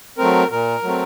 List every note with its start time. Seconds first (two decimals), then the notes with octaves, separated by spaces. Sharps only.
0.18 F#3 A3 C4 A#4
0.50 A#2 A#4
0.83 F#3 A3 C4